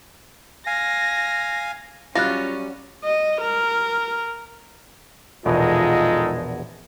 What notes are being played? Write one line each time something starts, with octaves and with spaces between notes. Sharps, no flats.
F5 G#5 A#6
F#3 G3 C#4 F4 F#6 A6 A#6
D#5
A#4
A#1 E2 B2 G#3 D#4 F4 A4